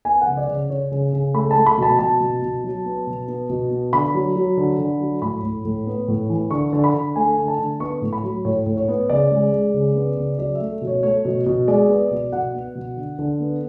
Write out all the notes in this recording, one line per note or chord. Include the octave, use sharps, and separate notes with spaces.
B3 G#5
F#5
C#3
D5
C#3
C#3 C#5
C#3
C#3
A3 B5
A5
A3
B5
B2 A5
B2 A5
B2
B2
F#3
B3
B2
B3
B2
B3
D3 B5
F#3
F#3
D3
D3
F#3
A2 B5
A2
A2
B3
A2
E3
D3 C#6
D3
B5
D3
A3 G#5
D3
A5
D3
B3 C#6
A2
B5
F#3
A2 C#5
A2
C#5
B3
C#3 D5
G#3
G#3
C#3
B3
C#3
F#3 D5
E5
A3
B2
C#5
A3 C#5
B2
B2
G#3 D5
B3
B2
B2 F#5
B3
B2
D3
D3
B3